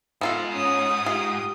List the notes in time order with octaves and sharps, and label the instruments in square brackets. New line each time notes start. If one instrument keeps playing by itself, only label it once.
[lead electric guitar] G#2 [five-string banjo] B3 F4 A4
[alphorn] C#4 [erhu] D#6
[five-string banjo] F4 [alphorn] G4